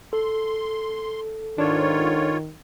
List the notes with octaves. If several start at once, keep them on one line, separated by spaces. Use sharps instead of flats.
A4 C6
G#2 D#3 D4 F4 C#5